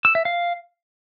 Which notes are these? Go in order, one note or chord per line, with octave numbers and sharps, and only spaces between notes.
E6
E5
F5